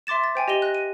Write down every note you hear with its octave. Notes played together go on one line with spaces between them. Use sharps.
E5 C6 D6 A6 E7
A6
C5 G5 G#5
G4 D#5 A#6 D#7 G7
F#6 A#6
D#7